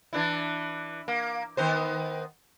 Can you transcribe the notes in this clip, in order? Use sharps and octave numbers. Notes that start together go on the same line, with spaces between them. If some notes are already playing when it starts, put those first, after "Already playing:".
E3 D4 E4
A#3
D#3 B3 C5